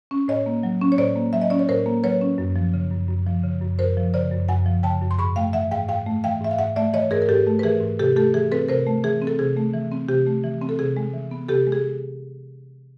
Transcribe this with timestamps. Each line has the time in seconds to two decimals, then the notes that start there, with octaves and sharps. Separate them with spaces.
0.11 C#4
0.28 A2 C#5 D#5
0.46 A#3
0.63 F#3
0.81 C#4
0.92 C#5
0.98 A2 C5 D5
1.16 A#3
1.33 F#3 E5
1.42 D#5
1.50 C#4 D5
1.59 C#5
1.69 A2 A#4 C5
1.86 A#3
2.04 F#3 B4 C#5
2.21 C#4
2.38 F#2
2.56 F3
2.74 C#3
2.91 F#2
3.08 F#2
3.26 F3
3.44 C#3
3.61 F#2
3.79 F#2 A#4 C5
3.97 F3
4.14 C#3 C5 D5
4.31 F#2
4.48 F#2 F#5 G#5
4.66 F3
4.83 C#3 G5 A5
5.02 F#2
5.11 C6
5.19 G#2 B5 C#6
5.36 A3 F5 G5
5.53 E3 E5 F#5
5.71 G#2 F5 G5
5.89 G#2 F5 G5
6.06 A3
6.24 E3 F5 G5
6.41 G#2 E5
6.51 F5
6.59 G#2 E5 F#5
6.76 A3 D5 E5
6.93 E3 C#5 D#5
7.11 G#2 G#4 A#4
7.22 A#4
7.29 G#2 G4 A4
7.47 A3
7.59 B4
7.63 E3 G#4 A#4
7.81 G#2
7.99 C3 G4 A4
8.16 A3 G4 A4
8.34 E3 G#4
8.51 C4 A4 B4
8.69 C3 A#4 C5
8.87 A3
9.04 E3 G#4
9.22 C4
9.27 A4
9.39 C3 G#4
9.57 A3
9.74 E3
9.92 C4
10.09 C3 G4
10.26 A3
10.44 E3
10.62 C4
10.69 A4
10.79 C3 G#4
10.97 G#3
11.14 E3
11.31 B3
11.49 C3 G4 A4
11.67 G#3
11.72 G#4